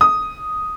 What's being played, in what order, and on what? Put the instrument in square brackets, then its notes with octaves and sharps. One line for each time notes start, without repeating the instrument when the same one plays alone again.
[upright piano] D#6